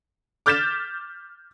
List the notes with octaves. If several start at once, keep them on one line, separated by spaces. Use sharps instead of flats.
D6 F6 G6 A6 B6 E7